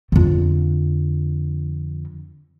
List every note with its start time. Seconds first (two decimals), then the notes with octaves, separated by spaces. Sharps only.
0.12 F2 D3